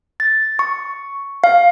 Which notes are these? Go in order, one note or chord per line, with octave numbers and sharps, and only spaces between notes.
A6
C#6
F5